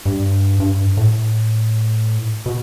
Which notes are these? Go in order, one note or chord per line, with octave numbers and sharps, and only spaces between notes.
G2
G2
A2
B2